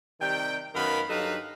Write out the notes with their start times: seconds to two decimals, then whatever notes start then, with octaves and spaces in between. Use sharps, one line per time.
0.20 C3 D#3 G3 G5
0.74 F#2 D#3 B3 A#4 F5 B5
1.09 G2 F#3 D#4 A4 B4 F5